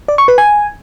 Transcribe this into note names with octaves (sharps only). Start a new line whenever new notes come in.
D5
C#6
B4
G#5